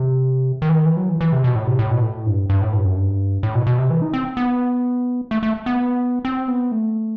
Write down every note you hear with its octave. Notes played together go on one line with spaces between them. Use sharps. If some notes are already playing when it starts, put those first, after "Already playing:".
Already playing: C3
D#3
E3
D#3
E3
F#3
E3
E3
C3
B2
A2
C3
A2
B2
A2
G2
G2
A2
G2
F#2
G2
A2
B2
B2
C3
E3
D#4
C4
B3
A3
A3
B3
C4
B3
A3